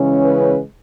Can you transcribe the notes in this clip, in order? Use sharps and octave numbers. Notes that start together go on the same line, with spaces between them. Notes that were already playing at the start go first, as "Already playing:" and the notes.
Already playing: C#3 E3 G#3 C#4
B4